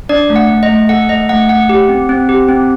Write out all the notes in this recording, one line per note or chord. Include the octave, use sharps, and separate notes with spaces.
D4 D5
A3
F#5
A3
D#5
A3
A4 F#5
A3 D#5
A3 F#5
A3 F#5
G4
C4
C4
G4
C4